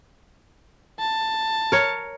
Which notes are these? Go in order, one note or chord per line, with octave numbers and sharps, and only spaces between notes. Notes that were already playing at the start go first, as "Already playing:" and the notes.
A5
A#4 C#5